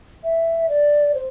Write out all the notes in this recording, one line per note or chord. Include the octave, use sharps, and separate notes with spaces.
E5
D5
C5